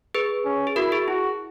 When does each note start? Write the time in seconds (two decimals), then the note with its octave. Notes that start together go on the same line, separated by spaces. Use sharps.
0.14 G#4 B4
0.45 C#4
0.67 G#4
0.76 E4 F#4 A#4
0.92 G#4
1.08 E4 F#4